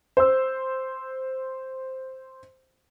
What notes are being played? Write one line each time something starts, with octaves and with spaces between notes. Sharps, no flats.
C5 E6